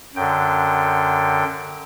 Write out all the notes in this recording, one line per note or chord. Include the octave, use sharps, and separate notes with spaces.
F#2 D3 G5